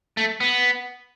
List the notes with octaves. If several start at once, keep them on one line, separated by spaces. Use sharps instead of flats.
A3
B3